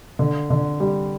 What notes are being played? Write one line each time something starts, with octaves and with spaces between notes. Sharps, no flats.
D3
D3
G3